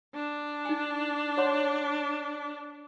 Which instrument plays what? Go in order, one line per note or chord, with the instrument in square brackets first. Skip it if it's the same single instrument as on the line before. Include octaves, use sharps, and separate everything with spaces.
[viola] D4
[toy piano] D#4 G#5
C#5 F#5 C6